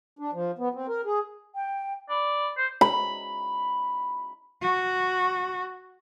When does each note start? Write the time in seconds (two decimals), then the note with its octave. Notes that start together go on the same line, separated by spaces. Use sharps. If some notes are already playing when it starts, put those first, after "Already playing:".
0.19 D4
0.33 F3
0.58 B3
0.74 C4
0.88 A#4
1.05 G#4
1.55 G5
2.10 D5 B5
2.57 C5
2.81 B5
4.62 F#4